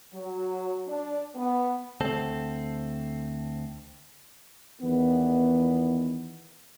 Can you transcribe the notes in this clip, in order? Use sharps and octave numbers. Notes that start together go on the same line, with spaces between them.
F#3
D4
B3
D2 C4 A4
E2 D#3 E3 B3